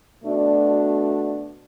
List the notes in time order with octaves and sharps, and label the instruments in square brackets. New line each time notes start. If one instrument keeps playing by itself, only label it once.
[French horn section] B2 A3 D4 F#4